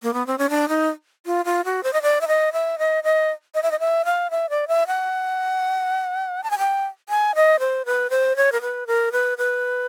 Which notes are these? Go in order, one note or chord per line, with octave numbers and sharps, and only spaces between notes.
A#3
B3
C4
C#4
D4
D#4
F4
F4
F#4
C5
D#5
D5
E5
D#5
E5
D#5
D#5
D#5
E5
D#5
E5
F5
E5
D5
E5
F#5
A5
G#5
G5
G#5
D#5
C5
B4
C5
C#5
A#4
B4
A#4
B4
B4